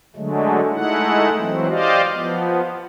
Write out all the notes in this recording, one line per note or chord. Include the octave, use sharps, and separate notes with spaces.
D3 F#3 G#3 A3
G#3 A3 D#4 E4 F#5
E3 F#3 C4
G4 C5 D5 D#5 F5
F3 B3